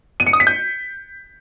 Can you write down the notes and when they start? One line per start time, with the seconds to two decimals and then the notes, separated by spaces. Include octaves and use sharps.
0.20 D#7
0.27 C#7
0.33 D#6
0.40 B6
0.47 G6